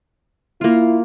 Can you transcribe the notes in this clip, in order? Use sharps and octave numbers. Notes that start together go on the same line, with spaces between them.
A#3 E4 F4